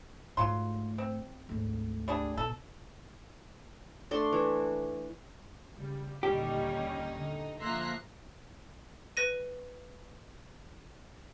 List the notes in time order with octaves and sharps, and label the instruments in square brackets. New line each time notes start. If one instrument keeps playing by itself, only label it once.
[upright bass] G#2 A3 [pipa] F#3 F4 C6
[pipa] C4
[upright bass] G#1 D2
[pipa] G3 D4 G#4
[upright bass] B2 [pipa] A4
[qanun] A3 D4 D5 C6
E3
[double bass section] C#3 [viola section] G3
[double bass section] D#2 A#2 D3 [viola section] G3 C#4 [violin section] D#4 [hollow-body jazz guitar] G4
[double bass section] D3
[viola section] F3 A#3 E5 [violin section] A#5 C6 F#6
[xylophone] B4 A#6 D#7